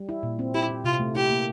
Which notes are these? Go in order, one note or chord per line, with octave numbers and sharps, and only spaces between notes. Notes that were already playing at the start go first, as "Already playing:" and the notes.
Already playing: G3
E4
A#2
C4
E4 G4
E4
C3 F4
A3
E4 G4
A#3